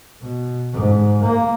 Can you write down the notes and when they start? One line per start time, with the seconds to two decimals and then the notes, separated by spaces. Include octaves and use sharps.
0.21 B2
0.73 G#2
1.22 A#3